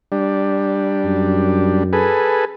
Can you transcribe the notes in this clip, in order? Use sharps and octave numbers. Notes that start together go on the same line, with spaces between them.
G3 D4
F#2
G#4 A4 B4